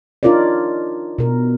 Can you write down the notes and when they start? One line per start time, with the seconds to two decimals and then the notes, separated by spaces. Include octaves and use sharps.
0.23 D4 D#4 F4 A#4 C#5 D5
1.18 B2 A#4